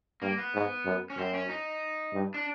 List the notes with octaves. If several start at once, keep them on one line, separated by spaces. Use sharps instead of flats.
G2 A#3
B3
G#2
F#2
C#4
F#2 C4
C#4
D#4
G2
D4